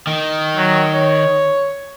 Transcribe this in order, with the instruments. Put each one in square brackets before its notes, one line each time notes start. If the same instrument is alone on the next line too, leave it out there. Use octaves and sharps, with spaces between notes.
[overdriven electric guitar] D#3
[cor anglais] F#3
C#5